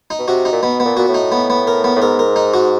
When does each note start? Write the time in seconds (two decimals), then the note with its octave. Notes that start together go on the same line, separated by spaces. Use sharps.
0.10 D#4
0.19 B2
0.28 C3 F#4
0.45 D#4
0.52 A#2
0.62 B2 B3
0.80 A#2 B3
0.97 A#2 F#4
1.08 A2
1.14 D#4
1.32 B3
1.50 B3
1.67 A#4
1.84 B3
1.96 A2
2.02 G#2 A#4
2.19 A#4
2.36 D#4
2.54 F#4